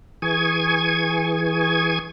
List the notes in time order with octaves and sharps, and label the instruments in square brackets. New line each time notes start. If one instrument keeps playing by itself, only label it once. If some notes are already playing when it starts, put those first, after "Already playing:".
[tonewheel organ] E3 G#4 G#5 C#6 G#6